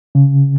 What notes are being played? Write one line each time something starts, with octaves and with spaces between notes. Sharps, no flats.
C#3